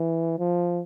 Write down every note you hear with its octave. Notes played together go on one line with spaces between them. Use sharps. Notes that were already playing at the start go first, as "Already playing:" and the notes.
Already playing: E3
F3